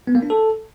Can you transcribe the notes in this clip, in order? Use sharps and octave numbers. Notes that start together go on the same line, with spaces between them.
B3
A#3
D4
A4